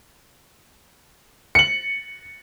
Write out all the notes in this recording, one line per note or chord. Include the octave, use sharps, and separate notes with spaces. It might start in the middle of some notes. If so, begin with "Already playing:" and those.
C#7 F#7